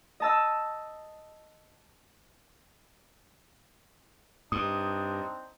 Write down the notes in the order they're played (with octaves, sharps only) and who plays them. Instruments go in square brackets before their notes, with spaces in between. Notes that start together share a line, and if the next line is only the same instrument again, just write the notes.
[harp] D#5 A5 E6
[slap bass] G2 [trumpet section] C4 D4 D#4 [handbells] D#6